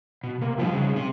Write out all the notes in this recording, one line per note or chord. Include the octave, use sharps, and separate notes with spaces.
B2
C3 A#3
C3 F3 G3 D#4
C#3
C3 C4